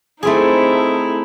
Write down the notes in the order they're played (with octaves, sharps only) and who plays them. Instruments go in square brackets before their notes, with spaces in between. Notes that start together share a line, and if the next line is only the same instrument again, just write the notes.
[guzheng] A3 C4 G#4 [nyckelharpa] D#4 E4